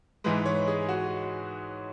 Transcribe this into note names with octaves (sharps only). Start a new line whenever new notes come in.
G#2 E3 G#3 B4
C#5
G#4
F#4